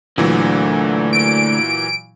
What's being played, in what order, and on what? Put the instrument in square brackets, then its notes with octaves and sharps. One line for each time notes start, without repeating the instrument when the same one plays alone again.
[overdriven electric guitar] D2 D3 [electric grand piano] A#2 E3 F#3
[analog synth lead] D7